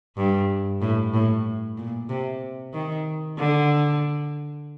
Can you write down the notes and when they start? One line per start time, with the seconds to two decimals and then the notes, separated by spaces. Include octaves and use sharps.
0.17 G2
0.82 A2
1.14 A2
1.77 A#2
2.09 C3
2.74 D#3
3.38 D3